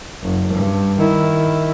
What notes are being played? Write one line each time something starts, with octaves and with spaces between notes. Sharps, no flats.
F#1
G2
D#3 E4